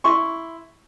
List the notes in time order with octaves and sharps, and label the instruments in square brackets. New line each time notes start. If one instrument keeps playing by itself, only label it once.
[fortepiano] E4 C6 C#6